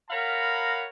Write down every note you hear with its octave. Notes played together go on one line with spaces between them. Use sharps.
A#4 C#5 F5 F#5 A#5 B5